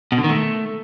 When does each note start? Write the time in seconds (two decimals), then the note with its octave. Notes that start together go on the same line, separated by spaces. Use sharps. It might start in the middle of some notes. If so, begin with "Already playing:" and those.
0.12 B2
0.18 D3
0.24 D#3
0.30 A3